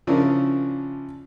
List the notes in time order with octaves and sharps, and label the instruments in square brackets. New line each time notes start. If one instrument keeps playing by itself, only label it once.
[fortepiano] C#3 F3 C#4 D4 E4 A#4